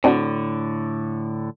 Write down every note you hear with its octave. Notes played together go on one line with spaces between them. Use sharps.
A2 D3 C4 D4 F#4